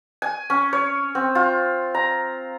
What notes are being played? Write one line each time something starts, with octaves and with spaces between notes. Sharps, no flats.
G#5
C#4
C#5
C4
F4
A#5